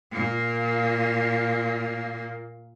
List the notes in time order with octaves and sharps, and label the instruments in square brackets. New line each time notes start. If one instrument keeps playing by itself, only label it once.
[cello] A#2 A#3